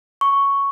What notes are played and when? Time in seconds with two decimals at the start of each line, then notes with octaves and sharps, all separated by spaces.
0.21 C#6